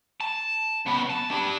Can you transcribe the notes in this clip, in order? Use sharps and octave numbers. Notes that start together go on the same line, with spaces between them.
A5
C#3 B3
A5
D4 G4